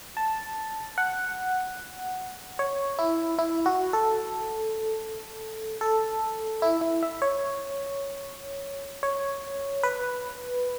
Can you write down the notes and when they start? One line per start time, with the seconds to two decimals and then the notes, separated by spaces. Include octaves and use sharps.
0.17 A5
0.98 F#5
2.59 C#5
2.99 E4
3.39 E4
3.66 F#4
3.93 A4
5.81 A4
6.62 E4
6.81 E4
7.03 E5
7.22 C#5
9.03 C#5
9.83 B4